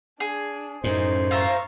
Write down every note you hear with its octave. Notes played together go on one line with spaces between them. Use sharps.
D4 G#4
F#2 A2 C#4 D#4 C5
F4 E5 F5 A#5 C#6